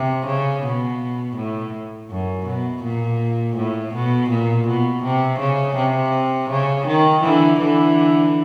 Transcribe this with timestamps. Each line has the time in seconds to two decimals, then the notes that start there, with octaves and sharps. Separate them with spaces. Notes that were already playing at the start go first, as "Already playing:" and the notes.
Already playing: C3
0.26 C#3
0.63 B2
1.36 A2
2.11 F#2
2.46 B2
2.83 A#2
3.56 A2
3.93 B2
4.30 A#2
4.67 B2
5.03 C3
5.39 C#3
5.76 C3
6.50 C#3
6.87 D#3
7.23 D3 E3
7.59 D3 E3